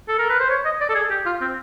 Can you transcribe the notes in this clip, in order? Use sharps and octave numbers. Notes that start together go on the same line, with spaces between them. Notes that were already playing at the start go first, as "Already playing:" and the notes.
A4
A#4
B4
C5
C#5
D#5
D5
A4
G#4
G4
F4
C4